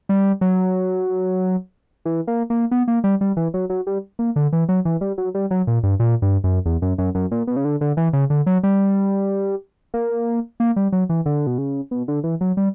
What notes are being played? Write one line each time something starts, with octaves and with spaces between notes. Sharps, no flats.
G3
F#3
E3
A#3
A#3
B3
A#3
G3
G3
E3
F#3
F#3
G3
A#3
D3
E3
F#3
E3
G3
F#3
G3
F#3
A#2
G2
A#2
G2
F#2
E2
F#2
F#2
F#2
A#2
B2
C#3
D3
D3
E3
C#3
D3
F#3
G3
A#3
A#3
G3
F#3
E3
D3
B2
C#3
B2
D3
E3
F#3
G3